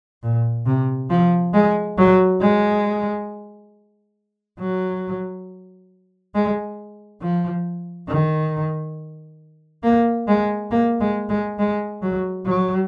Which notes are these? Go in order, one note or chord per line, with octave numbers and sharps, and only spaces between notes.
A#2
C3
F3
G#3
F#3
G#3
F#3
G#3
F3
D#3
A#3
G#3
A#3
G#3
G#3
G#3
F#3
F#3